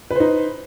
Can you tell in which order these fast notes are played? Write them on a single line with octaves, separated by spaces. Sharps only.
B4 C5 D#4